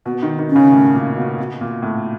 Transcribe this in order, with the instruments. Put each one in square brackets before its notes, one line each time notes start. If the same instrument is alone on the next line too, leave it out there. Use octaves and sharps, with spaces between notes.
[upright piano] B2 [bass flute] B3
[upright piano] D#3
D#3
[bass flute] C#4
[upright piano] C#3
A2
A#2
B2
B2
A#2
A2